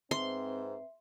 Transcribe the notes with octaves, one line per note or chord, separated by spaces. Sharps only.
G#2 C4 B4 E5 C6